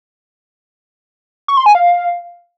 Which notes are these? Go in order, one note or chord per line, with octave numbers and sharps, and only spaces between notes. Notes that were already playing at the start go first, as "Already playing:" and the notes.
C#6
C6
G#5
F5